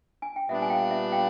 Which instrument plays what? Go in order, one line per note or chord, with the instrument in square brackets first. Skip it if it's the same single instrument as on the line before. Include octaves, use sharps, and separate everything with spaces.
[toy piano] G#5
G5
[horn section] A#2 G3 B3 D4 [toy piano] E5 F#5
[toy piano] G#5
F5 G5
E5 F#5
F5 G5